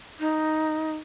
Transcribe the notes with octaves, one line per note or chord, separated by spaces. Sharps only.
D#4